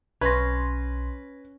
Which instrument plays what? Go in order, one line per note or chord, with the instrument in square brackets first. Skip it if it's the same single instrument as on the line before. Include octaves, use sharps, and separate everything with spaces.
[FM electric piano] B1 C6 [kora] C#4 [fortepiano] B4 [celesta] G#6 A#6